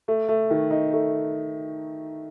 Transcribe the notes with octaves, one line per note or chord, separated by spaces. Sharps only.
A3
A3
D#3
D#4
A3